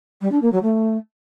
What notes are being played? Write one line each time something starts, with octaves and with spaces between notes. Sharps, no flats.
G3
D4
A#3
F#3
A3